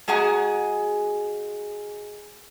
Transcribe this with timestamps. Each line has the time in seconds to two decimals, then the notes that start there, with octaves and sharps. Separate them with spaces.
0.08 G#3 F#4 G#4 F#5 A#5